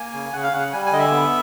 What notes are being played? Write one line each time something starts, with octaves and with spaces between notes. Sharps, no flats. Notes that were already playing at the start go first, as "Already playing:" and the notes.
Already playing: A#3 G#5
C#3
C#3 F#5
F5
C#3 F#5
G3 G#5
G#5
D3 D#5
E5
B3